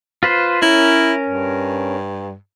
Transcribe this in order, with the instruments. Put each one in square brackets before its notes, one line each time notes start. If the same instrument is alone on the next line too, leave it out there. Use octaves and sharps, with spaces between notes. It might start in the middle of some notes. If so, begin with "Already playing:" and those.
[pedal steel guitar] F4 B4 C5
[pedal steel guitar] C#4 A#4 [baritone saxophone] E4
[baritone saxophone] G2